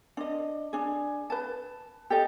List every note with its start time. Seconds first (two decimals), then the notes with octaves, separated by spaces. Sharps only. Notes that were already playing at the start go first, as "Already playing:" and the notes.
0.17 D4 D#5
0.73 D4 G#4
1.30 B4 A5
2.10 G4 A4 D#5